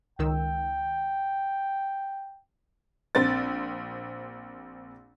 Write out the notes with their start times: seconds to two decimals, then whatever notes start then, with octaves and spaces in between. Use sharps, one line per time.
0.19 C#2 D#3 G5 E6
3.15 A#1 C4 A6